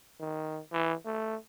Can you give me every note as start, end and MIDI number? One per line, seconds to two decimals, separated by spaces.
0.20 0.60 51
0.72 0.93 52
1.06 1.36 57